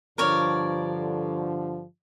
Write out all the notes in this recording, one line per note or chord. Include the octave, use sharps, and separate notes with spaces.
G2 D3 F3 A#4 C#5 D5